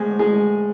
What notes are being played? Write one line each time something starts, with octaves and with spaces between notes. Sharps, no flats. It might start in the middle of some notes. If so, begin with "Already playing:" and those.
Already playing: A2 G#3 G#5
G#3